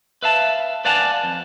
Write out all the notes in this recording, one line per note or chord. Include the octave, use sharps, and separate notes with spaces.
B4 E5 F5 A5
B4 D5 F5 F#5 G#5 A5
F2